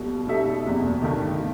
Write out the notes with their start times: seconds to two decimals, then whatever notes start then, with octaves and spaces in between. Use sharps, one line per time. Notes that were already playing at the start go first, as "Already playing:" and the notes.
Already playing: B1 B2 G3
0.27 B2 G3 D#4 A4 E5
0.64 F#1 E2 B2
1.01 G2 D#3 A3 D#4 G4
1.38 B2